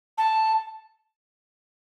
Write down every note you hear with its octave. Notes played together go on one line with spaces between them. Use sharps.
A5